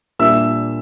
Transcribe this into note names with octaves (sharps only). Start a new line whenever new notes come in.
A#2 G3 A#3 D4 E5 E6